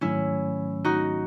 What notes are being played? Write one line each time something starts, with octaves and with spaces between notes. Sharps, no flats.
G#2 D#3 F#3 A3 C#4 E4
D#4 F#4